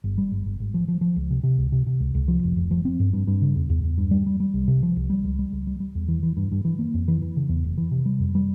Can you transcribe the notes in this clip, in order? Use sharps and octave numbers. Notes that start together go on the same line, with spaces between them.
G1
G3
G1
G1
G#1
F3
F3
F3
C#2
C3
C3
C#2
C3
C3
C#2
C#2
F3
F1
F1
F3
C4
G2
G2
G2
C#3
E2
E2
E2
G2
G3
G3
G3
C2
C3
F3
C2
G3
C#2
G3
C#2
G3
G3
E2
E3
E3
G2
G2
E3
A#3
F2
E3
E3
C#3
E2
F1
E3
C3
G3
F2
G3